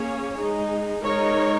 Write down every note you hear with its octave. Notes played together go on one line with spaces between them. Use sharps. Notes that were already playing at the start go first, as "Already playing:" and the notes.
Already playing: A#3 C#4 G#4 C#5
G#3 D#4 G#4
G#3 D#4 A#4 C#5